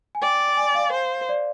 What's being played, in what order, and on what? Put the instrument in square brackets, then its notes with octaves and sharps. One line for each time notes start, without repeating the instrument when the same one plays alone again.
[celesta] G#5
[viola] D5 [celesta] G5
[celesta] G#5
F5
[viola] C5
[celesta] D5